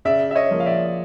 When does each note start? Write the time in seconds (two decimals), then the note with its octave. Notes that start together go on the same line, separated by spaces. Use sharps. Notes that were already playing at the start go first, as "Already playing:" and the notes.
0.05 C#3 D5 E5
0.31 E5
0.35 C#5 D#5
0.51 F3 A#3
0.60 F5
0.66 D5 E5